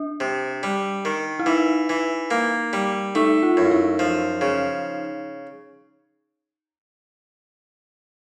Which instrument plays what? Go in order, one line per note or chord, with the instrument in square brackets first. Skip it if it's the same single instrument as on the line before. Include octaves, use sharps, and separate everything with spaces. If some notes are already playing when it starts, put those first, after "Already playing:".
Already playing: [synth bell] D4
[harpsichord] C3
G3
D#3
[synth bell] E4
[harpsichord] E3 [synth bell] D#4
[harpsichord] E3
A#3
G3
[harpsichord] A3 [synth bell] D#4
[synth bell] F4
[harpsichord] F#2
[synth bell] E4
D#4
[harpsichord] F3
C#3